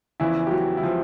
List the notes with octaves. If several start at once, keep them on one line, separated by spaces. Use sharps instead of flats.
E2 C#3 E3 F3 E4
G4
F#3 F#4
E4
F3 F4